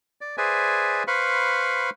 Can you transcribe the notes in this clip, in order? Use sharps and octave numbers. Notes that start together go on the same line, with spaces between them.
D5
G#4 B4 C5 D5 E5 G#5
B4 C5 F5 B5 C#6